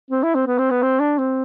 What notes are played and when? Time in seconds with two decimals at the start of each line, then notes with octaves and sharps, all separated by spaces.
0.11 C4
0.23 E4
0.35 C4
0.47 B3
0.58 C4
0.70 B3
0.82 C4
1.00 D4
1.18 C4